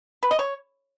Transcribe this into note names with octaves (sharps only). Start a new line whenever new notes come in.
B4
D#5
C#5